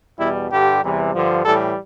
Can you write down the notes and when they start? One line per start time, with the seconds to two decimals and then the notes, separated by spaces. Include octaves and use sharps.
0.18 E2 B2 G3 E4
0.50 G2 D3 G3 G4
0.82 E2 C3 E3 G3
1.13 G2 D3 F3
1.45 A2 E3 G3 A4